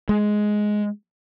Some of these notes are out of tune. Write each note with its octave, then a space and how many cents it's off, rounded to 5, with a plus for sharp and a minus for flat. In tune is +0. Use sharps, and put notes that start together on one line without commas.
G#3 +10